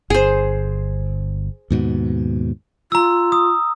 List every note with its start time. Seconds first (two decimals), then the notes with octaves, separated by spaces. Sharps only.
0.10 G1 G#4 C5
1.71 D#2 G#2 B2
2.92 F4 A#5 E6
3.32 D#6